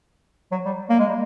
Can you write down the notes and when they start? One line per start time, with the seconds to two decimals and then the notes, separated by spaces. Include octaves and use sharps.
0.52 F#3
0.66 G3
0.90 A#3
0.99 G#3
1.09 G3